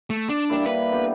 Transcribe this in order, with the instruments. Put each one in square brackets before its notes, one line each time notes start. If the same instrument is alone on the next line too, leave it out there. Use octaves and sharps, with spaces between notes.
[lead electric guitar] A3
D4
[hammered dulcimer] G3 A#3 E4
[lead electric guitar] B4
[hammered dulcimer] D3 B3 G4